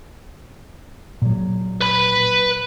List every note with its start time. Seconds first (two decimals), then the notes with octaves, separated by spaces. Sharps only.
1.22 A#2 F#3
1.81 B4 B5